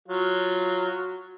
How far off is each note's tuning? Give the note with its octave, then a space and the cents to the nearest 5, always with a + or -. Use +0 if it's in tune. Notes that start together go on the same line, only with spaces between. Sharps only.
F#3 -5 F4 +0